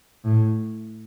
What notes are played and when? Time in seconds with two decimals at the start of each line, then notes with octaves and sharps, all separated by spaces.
0.24 A2